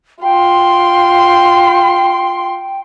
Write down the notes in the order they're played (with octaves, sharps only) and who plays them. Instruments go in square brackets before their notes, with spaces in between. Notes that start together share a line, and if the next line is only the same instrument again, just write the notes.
[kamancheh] F4 C6 [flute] G5